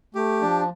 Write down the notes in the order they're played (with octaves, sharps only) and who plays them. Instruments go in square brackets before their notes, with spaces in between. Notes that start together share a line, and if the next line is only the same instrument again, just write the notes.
[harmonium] A3 [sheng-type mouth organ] G4
[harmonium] F3 [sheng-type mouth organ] D4